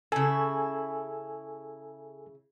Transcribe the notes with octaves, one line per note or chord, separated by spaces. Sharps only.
C#3 E4 A4 G#5 E6